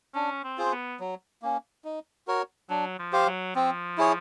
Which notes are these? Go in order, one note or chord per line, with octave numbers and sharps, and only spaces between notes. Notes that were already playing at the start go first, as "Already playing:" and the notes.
C#4 D4
C4
F4 G#4 C5
C4
B3
F#3
A#3 C#4
D#4
F#4 A#4 C#5
F#3 D4
F3
G4 C5 F5
F#3
F3 C4
E4 G#4 C#5